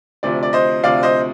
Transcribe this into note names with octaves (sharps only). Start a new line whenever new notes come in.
D2 C3 F3 D5
D5
C5 D#5
D2 C3 F3 D5 F5
C5 D#5